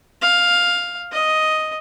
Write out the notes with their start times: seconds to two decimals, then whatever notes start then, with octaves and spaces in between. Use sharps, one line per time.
0.22 F5
1.12 D#5